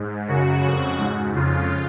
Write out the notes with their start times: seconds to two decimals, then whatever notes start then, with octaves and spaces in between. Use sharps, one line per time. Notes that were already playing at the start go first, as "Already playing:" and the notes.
Already playing: G#2
0.28 F#2 C#3 F#4
0.63 F2 C#3
0.98 G#2
1.34 F2 C#3 F4